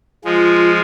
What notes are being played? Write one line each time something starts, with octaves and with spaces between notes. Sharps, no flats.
F3 G#3 F4